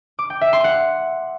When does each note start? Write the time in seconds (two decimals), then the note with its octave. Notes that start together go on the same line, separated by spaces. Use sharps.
0.19 D6
0.30 G5
0.41 E5
0.53 C6
0.64 F#5